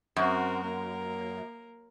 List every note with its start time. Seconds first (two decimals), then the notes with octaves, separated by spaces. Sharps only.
0.16 F#2 C4 F#4 A#4
0.62 A#3 A#4